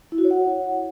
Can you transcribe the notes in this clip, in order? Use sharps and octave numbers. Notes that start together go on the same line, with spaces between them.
E4
F#4
C#5
F#5